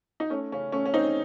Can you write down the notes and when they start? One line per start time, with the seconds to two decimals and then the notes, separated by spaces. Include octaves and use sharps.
0.20 D#4
0.30 A3 C#4
0.52 C#3 C#4
0.72 A3 C#4
0.86 C#4
0.94 C#3 C4 D#4